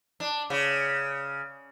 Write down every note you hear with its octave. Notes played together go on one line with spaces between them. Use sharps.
D4
C#3